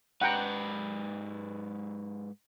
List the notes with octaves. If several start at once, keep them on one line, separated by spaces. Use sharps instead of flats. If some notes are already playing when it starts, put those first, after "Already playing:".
G#2 B4 F#5 G5 A#5